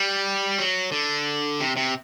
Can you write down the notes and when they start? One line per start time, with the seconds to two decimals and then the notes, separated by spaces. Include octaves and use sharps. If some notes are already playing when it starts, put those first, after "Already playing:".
Already playing: G3
0.58 F#3
0.92 D3
1.60 C3
1.76 C3